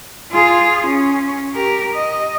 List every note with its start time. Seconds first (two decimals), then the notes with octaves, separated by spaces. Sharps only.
0.32 F4 G#4
0.86 C#4
1.54 G4 A#4
1.95 D#5